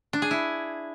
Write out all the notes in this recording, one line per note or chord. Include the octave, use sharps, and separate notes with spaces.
D4
G#4
E4